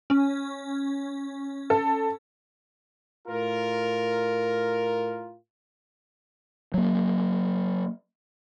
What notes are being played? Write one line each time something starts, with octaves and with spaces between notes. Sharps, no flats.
C#4
A4
A2 F4 A#4
F#3 A#3